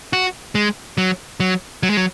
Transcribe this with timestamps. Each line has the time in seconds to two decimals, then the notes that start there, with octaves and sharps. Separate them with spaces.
0.13 F#4
0.55 G#3
0.98 F#3
1.40 F#3
1.83 F#3
1.90 G#3
1.97 F#3